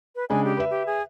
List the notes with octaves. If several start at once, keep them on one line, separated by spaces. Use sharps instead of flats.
B4
C#3 G#3 D4 G#5
G4
B4 E5
G4
G#4